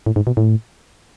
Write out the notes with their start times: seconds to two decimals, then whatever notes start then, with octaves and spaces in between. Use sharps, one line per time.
0.06 A2
0.16 G#2
0.27 B2
0.37 A2